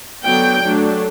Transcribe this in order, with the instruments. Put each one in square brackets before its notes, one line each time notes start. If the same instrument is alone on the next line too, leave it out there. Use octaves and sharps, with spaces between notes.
[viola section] D3 F#3 B3 D4 G5
F#3 A3 D4